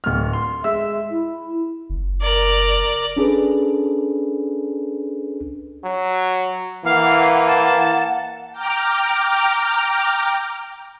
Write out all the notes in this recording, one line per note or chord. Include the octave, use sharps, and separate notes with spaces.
D1 F6
C6
G#3 E5 E6
E4
F#1
A#4 D5
C#4 D4 G#4 A4 B4
F#3
E3 A#3 F5 F#5
A5
G5 A#5 D6 F6